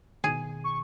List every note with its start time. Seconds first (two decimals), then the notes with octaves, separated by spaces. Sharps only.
0.24 B2 D#3 G#4
0.64 C#6